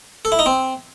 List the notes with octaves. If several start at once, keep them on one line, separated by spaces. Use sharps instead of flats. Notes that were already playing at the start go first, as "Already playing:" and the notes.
A4
E4
D#4
C4